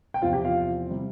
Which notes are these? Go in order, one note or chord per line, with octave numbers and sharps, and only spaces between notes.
G5
E2 C3 F3 C4 F4 F5
G4 G5
F4 F5
C3 G3